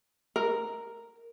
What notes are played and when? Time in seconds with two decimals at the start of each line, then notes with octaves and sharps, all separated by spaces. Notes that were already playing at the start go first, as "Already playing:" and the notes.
0.36 A#4